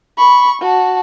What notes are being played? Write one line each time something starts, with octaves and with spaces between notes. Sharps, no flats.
B5 C#6
F#4 A5